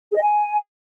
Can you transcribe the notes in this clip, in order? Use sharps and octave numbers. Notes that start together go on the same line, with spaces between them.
G#4
D#5
G#5